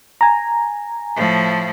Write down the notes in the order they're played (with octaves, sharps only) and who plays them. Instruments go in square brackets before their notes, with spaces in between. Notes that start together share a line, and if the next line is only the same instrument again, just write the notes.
[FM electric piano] G#5 A#5
[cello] A2 F3